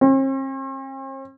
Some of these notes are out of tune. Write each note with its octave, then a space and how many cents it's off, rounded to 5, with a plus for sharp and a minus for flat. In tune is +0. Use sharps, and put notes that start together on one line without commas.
C4 +45